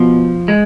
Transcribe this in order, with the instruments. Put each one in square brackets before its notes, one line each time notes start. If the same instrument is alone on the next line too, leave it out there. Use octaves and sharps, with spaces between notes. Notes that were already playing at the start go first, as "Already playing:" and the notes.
Already playing: [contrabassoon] B2 [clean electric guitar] F3
[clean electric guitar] G#3